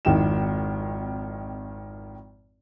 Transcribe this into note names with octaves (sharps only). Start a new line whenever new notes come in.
G#1 F2 D#3 E4 G5 E7